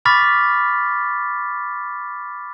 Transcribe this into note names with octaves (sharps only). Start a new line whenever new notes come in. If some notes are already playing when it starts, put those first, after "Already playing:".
B5 C#6 D6 F6 A6 B6